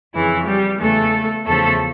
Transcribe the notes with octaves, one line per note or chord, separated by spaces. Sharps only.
F2 C#3 E3 E4
G3 G4
E2 C#3 E3 A3 A4
E2 C#3 F3 A3 A4